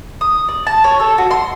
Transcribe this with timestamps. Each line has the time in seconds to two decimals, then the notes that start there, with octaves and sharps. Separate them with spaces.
0.21 D#6
0.48 D5
0.67 A5
0.84 C#5
1.00 A4
1.18 F#4
1.31 C6